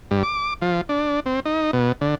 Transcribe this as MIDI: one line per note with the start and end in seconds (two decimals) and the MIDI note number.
0.11 0.23 43
0.23 0.54 86
0.62 0.81 53
0.89 1.20 62
1.26 1.40 60
1.45 1.71 63
1.73 1.92 47
2.01 2.15 50